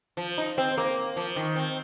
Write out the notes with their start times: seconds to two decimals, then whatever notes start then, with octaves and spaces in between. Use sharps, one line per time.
0.17 F3
0.38 D#4
0.58 C4
0.78 A#3
1.16 F3
1.36 D#3
1.56 C4